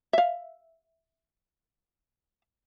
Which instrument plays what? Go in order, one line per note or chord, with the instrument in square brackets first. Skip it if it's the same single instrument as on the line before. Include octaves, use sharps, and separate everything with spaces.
[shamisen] E5 F5